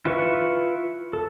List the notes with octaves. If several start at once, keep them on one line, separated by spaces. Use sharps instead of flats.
E4 F4 B4 E5 C#6
A4